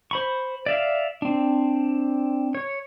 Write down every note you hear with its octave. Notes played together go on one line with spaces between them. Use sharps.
C5 B5 C#6
D5 E5 F5
C4 D4
C#5